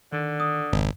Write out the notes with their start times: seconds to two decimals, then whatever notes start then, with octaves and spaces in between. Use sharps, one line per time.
0.13 D3 D#3
0.40 D#6
0.73 G#1 F2 G#2 C#3